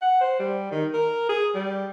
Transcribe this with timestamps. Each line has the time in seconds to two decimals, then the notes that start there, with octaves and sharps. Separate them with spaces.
0.02 F#5
0.21 C5
0.40 G3
0.72 D#3
0.94 A#4
1.29 G#4
1.55 G3